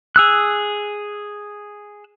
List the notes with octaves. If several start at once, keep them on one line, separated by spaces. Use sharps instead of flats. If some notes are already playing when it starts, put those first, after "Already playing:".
G#4 E6 F#6